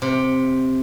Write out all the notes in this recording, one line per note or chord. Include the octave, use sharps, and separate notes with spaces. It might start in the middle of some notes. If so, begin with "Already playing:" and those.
C3